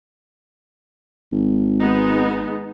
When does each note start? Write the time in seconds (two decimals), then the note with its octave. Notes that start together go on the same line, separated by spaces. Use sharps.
1.32 G#1
1.80 G#3 B3 D#4